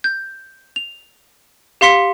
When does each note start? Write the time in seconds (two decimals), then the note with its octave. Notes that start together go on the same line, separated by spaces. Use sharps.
0.04 G6
0.76 F7
1.81 G4 F5 C6 B6 C#7